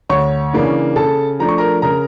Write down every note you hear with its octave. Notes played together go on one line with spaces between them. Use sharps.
D2 C#5 C#6
C#3 E3 A#3 D4
C#3 A4 A5
F3 A3 D4 A#5
C#6
A#4 A#5
C#3 A#4 A#5